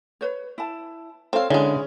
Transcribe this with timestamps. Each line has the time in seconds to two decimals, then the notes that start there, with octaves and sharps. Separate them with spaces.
0.21 B4 C#5
0.58 E4 A5
1.33 C4 A4 C#5 F5
1.50 D3 E3 G#3 C#4 G#4